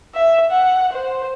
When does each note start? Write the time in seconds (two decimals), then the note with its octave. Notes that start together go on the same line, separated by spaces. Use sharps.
0.15 E5
0.51 F#5
0.93 C5